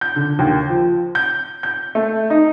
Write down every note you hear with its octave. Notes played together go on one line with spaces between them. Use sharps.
G6
D3
D#2
F3
G6
G6
A3
D#4